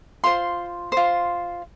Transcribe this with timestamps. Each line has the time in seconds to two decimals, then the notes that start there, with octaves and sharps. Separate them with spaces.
0.24 F4 C5 C6
0.92 F4 C5